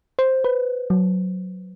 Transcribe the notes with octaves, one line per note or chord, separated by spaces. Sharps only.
C5
B4
F#3